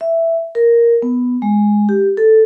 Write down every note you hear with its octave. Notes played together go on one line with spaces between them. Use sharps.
E5
A#4
B3
G#3
G4
A4